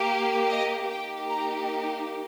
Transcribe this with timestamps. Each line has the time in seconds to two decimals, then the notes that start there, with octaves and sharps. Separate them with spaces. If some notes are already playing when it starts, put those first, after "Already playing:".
Already playing: A#3 G4
0.48 D#5
0.90 A#3 D#4 G4 G5
1.30 A#5